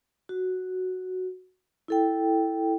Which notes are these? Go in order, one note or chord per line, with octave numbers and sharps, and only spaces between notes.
F#4
E4 A4 G5